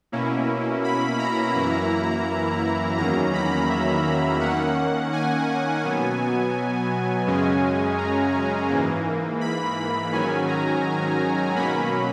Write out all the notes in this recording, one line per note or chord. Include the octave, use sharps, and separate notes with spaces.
B2 A#3 C#4 E4
B5
A#5
F#2 E3 A#3 E4
E2 D#3 F#3 A#3 C#4 A#5
B5
E5
D#3 A#3 C#4 F#5
G#5
B2 F#3 B3
F#2 C#3 G#3 C#4
A#5
G#2 E3 A#3
B5
G#2 D#3 F#3 C#4 G#5
A#5
B2 F#3 A#3 C#4 B5